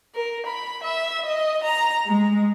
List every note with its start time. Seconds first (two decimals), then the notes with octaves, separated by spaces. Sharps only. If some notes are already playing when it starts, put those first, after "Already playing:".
0.14 A#4
0.47 B5
0.84 E5
1.26 D#5
1.64 A#5
2.07 G#3